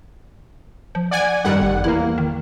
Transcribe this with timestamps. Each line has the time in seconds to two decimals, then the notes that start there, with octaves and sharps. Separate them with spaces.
0.95 F3
1.11 D5 F#5 G#5
1.44 F#2 D#3 G3 F#5
1.59 G1
1.84 E2 A#3 E4
2.18 D#3